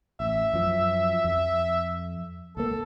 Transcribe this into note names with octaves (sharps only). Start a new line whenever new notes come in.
A1 E5
F#2 F3
F2
C#2 A#3 A4